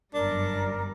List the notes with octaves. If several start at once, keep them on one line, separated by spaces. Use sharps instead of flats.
G1 F#2 G3 D4 A#4